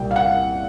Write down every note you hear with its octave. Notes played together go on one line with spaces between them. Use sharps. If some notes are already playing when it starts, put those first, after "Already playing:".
Already playing: C2 A#2 G3 G5
F5
F#5